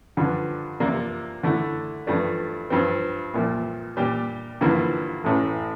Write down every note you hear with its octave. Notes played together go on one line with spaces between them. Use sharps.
G2 D3 F3
C3 F3 A#3 D4 F4
D3 A3 E4
G2 F3 A3 D4
G2 F3 C4
C2 A#2 F3
A#2 G3 D4 G4
G2 D3 F3 A#3 E4
A1 A2 E3